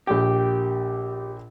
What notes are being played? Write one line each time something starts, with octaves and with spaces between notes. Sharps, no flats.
A#1 G4 G5